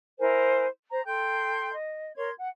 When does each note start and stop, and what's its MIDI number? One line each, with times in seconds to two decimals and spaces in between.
0.19 0.65 64
0.19 0.65 70
0.19 0.65 72
0.19 0.65 80
0.90 1.01 72
0.90 1.01 82
1.05 1.73 69
1.05 1.73 79
1.05 1.73 84
1.05 1.73 91
1.73 2.13 75
2.16 2.30 70
2.16 2.30 73
2.16 2.30 84
2.16 2.30 92
2.38 2.49 78